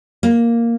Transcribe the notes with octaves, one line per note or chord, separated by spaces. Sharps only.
A#3